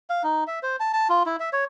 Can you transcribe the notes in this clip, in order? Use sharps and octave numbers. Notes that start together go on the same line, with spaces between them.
F5
D#4
E5
C5
A5
A5
F4
E4
E5
C#5